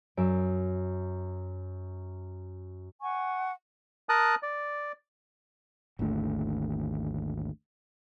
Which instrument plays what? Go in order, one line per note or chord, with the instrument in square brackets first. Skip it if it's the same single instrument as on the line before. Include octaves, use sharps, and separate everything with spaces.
[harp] F#2 E5 D7
[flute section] F#5 G#5 C#6
[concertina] A#4 A5 D#6 F#6
D5
[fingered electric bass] G#1 D#2 D3 A3